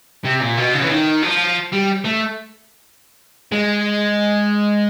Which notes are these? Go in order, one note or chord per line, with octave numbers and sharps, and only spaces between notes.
C3
A#2
B2
C#3
E3
D#3
F3
G3
A3
G#3